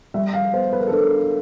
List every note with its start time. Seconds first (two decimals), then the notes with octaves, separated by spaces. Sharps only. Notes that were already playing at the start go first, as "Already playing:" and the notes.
0.14 G3 E5
0.34 F5
0.54 B3 C5
0.72 B4
0.80 A#4
0.87 A4
0.92 D4 A#4